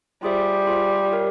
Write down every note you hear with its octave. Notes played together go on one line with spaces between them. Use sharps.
G3 F4 G#4 C5 E5
F4 G#4 C5 E5
G4 A#4 C#5 E5